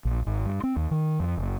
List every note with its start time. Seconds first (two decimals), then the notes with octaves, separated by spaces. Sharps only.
0.05 A#1
0.26 G#1
0.46 G2
0.63 C4
0.76 D#2
0.91 D#3
1.20 F2
1.38 F#1